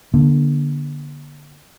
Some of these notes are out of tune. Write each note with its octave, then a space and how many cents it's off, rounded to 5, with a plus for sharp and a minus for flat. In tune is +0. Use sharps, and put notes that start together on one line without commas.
D3 +0 A#3 +45